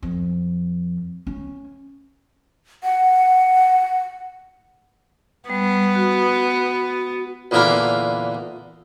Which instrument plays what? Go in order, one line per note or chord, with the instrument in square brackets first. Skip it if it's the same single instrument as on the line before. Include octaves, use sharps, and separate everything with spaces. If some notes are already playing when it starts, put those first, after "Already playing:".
[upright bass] F2
C#4
[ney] F#5
[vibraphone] G3 [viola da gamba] B3
[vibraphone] F#4
[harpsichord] E2 A#2 D3 A#4 F5 B5